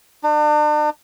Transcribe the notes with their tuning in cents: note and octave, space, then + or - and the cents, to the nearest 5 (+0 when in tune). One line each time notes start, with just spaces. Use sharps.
D4 +40